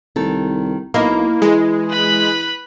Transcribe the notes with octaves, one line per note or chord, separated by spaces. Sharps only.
C2 D#3 A4
B1 A#3 E4 D#5 E5
E3 G#3
B4 B5